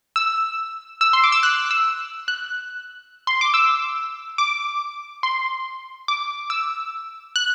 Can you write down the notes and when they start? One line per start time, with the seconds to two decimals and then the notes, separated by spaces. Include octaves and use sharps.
0.16 E6
1.01 E6
1.13 C6
1.24 D6
1.32 E6
1.43 F#6
1.71 E6
2.28 F#6
3.27 C6
3.41 D6
3.54 E6
4.38 D6
5.23 C6
6.08 D6
6.50 E6
7.36 F#6